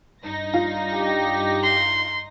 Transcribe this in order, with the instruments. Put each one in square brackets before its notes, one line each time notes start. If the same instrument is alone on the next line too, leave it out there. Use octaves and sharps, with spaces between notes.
[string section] G2 D#4 A#6
[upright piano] F4
[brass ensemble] G4
[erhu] C6